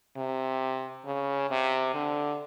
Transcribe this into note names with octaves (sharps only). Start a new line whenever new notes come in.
C3
C#3
C3
D3